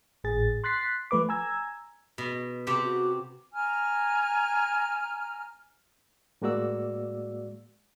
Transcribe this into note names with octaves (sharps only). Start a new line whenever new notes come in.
G#1 A2 G#4 A6
C6 F#6 A6 B6 C7
F3 A3 B4 D6
G#5 A#5 E6 G#6
B2
C3 C4 G4
F#4
G#5 A#5 F6
A2 G#3 A#3 F#4 D5 E6